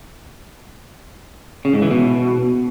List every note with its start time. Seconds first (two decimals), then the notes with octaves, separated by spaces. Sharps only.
1.65 C#3
1.73 G#2
1.82 E3
1.91 B2